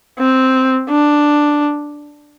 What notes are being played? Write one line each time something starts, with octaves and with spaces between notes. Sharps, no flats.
C4
D4